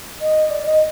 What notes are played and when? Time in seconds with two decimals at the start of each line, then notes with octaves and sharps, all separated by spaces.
0.21 D#5
0.50 D5
0.65 D#5